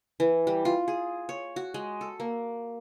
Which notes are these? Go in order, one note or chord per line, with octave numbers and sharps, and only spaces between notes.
E3
G3
F4
G#4
C#5
F#4
G#3
A4
A#3